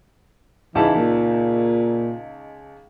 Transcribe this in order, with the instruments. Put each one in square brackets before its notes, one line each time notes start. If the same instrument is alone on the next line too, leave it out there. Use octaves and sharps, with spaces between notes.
[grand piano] C#2 D#4 A5 [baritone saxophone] E3
[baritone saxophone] A#2